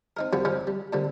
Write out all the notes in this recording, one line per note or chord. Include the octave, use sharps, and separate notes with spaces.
C4 D#4 A#4
F#2 F3 G3 C4 F#4 C#5
F3 G3 C4 C#4 A#4
G3
A#2 D3 G3 C4